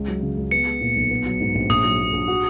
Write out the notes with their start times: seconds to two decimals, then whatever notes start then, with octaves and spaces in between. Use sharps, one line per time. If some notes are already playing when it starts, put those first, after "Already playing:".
Already playing: C#2
0.08 F#3
0.22 C#3
0.37 C#2
0.51 B3 C#7
0.66 G#3
0.81 A#2
0.96 B1
1.11 B3
1.26 F#3
1.40 G#2
1.55 A#1
1.69 A#1 D#6
1.84 F#3
1.99 A#2
2.13 A#1
2.28 F#4